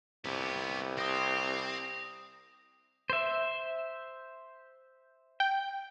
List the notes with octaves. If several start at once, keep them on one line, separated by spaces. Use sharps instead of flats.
C2 B3 G4
C4 D#6 A#6
C5 E5
G5